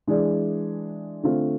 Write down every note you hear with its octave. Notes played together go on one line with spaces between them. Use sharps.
E3 G#3 D4 G#4 D5
D3 A3 C4 F4